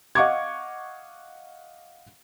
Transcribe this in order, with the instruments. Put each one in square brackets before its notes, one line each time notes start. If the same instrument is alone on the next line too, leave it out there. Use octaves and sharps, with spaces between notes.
[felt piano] D#5 F5 F#5 C#6 D6 G#6